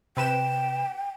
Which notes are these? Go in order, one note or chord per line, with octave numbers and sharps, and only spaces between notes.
C3 B4 G5 E7